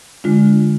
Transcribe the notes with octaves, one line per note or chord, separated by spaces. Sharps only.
D3 G#3 D4 F4